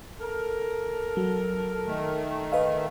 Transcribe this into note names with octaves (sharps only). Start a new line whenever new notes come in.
A4 A#4
F#3
D#3 A3
B4 D#5 F5